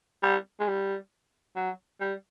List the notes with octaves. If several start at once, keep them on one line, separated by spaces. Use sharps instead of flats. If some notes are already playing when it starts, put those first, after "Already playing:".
G3
G#3
G3
F#3
G3